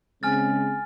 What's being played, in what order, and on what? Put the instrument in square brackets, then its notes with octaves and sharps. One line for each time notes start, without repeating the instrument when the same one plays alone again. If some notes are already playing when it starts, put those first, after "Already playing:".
[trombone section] C#3 G#3 C4 [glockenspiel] G#5 F6 A6